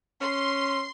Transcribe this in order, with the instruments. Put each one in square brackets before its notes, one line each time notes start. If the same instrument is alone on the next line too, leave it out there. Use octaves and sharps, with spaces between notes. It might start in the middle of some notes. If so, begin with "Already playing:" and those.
[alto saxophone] C#4 [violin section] C6